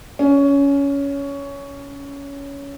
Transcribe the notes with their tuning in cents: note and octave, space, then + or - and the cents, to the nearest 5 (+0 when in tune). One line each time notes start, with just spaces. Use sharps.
C#4 +15